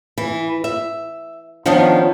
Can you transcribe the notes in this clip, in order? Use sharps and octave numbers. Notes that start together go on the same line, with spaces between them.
E3
E5
D#3 F3 B3 C#4 D4